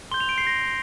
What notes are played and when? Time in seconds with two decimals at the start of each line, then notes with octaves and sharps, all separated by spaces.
0.11 C6 G6 G7
0.20 F7
0.29 D7
0.38 C7
0.47 A#6